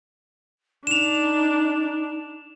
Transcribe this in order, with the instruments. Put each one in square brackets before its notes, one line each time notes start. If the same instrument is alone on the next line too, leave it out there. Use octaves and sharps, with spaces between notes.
[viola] D4 [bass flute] D#4 [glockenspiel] E7 F7